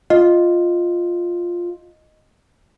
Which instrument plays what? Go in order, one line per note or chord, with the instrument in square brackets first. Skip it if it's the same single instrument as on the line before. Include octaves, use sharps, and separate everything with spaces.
[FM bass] F4 [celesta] D#5